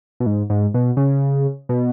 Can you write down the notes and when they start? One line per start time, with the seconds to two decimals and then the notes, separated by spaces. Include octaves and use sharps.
0.20 B2
0.26 G#2
0.50 G#2
0.74 B2
0.97 C#3
1.69 B2